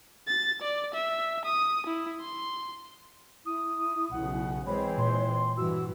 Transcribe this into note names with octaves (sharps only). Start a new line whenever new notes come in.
A6
D5
E5
D#6
E4
C6
E4 D#6
B1 C#3 F#5
E3 G#3 C4 C#5 B5
A#2 C6
G2 E3 F#4 E6